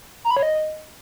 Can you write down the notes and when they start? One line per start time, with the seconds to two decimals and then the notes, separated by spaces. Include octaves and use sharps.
0.25 A#5
0.31 B5
0.37 C#5
0.43 D#5